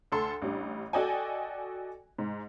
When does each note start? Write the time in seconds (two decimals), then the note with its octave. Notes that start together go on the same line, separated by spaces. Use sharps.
0.12 D2 A4 C6
0.42 A1 G3 D4
0.93 F#4 A4 D5 D#5 G5 G#5
2.18 G#2